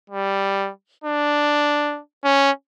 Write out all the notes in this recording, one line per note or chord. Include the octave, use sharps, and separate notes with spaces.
G3
D4
C#4